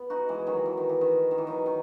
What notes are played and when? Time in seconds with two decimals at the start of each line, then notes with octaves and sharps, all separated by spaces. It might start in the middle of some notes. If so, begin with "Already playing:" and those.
Already playing: B3
0.10 D#4 F#4
0.29 E3 G#3
0.47 D#3 F#3
0.66 E3
0.77 D#3
0.89 E3
1.01 D#3
1.31 D#3
1.38 E3
1.47 D#3 F#3
1.66 D#3